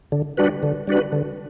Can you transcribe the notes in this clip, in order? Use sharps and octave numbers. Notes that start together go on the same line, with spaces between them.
D3
G3 D4 F#4 B4
D3
G3 D4 F#4 B4
D3